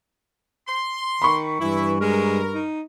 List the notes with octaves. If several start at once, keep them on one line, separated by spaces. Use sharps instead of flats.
C6
D#3 B5 C#6
G2 E3 E4
G#3 A#4
D#4